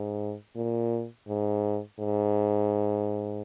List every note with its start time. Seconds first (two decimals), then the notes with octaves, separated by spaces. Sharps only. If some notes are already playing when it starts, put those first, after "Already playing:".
Already playing: G#2
0.56 A#2
1.28 G#2
2.00 G#2